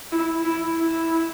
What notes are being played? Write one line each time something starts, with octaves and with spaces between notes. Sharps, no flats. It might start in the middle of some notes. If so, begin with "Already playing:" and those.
E4
E4
E4